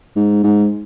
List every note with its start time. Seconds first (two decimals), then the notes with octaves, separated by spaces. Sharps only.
0.16 G#2
0.44 G#2